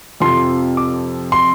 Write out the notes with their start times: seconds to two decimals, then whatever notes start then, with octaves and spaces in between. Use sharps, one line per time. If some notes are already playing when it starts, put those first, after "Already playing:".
0.20 F2 C3 F3 C6
0.77 D6
1.32 C6